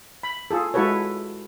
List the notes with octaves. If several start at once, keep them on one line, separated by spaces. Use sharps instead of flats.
B5
F4 G#4 A4
G#3 E4 F#4 A4 B4 C#5